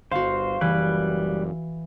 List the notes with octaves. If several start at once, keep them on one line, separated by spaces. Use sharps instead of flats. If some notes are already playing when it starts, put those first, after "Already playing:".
G1 F#4 C5 F5
F#1 E3 G3 B4